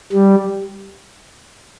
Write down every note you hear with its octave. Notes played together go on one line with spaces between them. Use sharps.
G3